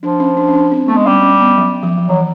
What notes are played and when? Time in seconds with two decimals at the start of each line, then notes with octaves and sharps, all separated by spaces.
0.02 F3 D4
0.20 C#4
0.37 D4
0.48 C#4
0.54 D4
0.72 C4
0.88 A3 B3
0.97 G#3
1.06 G3 C#4
1.23 C#4
1.41 B3
1.58 F#3
1.83 F3
1.98 F3
2.08 E3 F#3